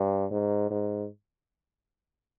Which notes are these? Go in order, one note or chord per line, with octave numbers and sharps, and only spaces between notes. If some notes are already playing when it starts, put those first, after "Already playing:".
Already playing: G2
G#2
G#2